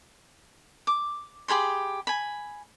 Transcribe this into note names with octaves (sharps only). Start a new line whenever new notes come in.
D6
G4 G#4 B5 C6
G#5 B5